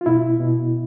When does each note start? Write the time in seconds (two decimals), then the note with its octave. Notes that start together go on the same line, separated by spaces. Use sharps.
0.01 F4
0.06 B2 E4
0.40 B2